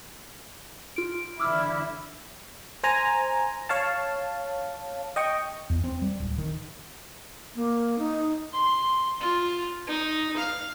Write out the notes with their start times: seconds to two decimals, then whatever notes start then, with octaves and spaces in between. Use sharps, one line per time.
0.96 F4 D7
1.40 D3 E3 E4 D6 E6 F6
2.83 C5 G#5 A#5
3.69 C#5 F5 A5
5.16 D#5 G5 C#6
5.70 E2
5.84 C4
6.02 G3
6.20 D1
6.38 D#3
7.56 A#3
7.99 D#4
8.53 C6
9.21 F4
9.87 D#4
10.37 F5